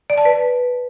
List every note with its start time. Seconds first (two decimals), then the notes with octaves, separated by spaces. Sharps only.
0.10 D5
0.18 A5
0.25 B4